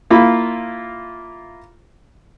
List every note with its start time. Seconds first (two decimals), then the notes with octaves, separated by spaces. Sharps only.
0.10 A#3 E4 F4 B5